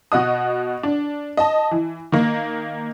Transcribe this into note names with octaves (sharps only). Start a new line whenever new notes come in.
B2 F#4 D#5 D#6
D4
D#5 A5
E3
D#3 A#3